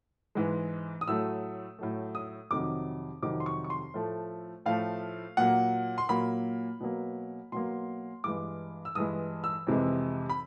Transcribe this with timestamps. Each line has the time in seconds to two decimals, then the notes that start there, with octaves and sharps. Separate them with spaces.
0.35 G#2 E3 G#3
1.01 D#6
1.07 A2 F#3 A3 E6
1.79 A2 F#3 A3
2.15 D#6
2.51 F2 C3 D#3 F#3 D6
3.22 F2 C3 D#3 F#3 D6
3.40 C6
3.46 C#6
3.64 C#6
3.70 C6
3.94 A2 F3 A3
4.66 A2 F3 A3 F5
5.37 A#2 F#3 A#3 F#5
5.98 C6
6.09 A#2 F#3 A#3 B5
6.80 B2 F#3 A#3
7.52 B2 F#3 A#3 C6
8.24 G2 E3 G#3 D6
8.85 E6
8.95 G2 E3 G#3 D#6
9.44 E6
9.67 F2 C3 E3 G#3
10.30 B5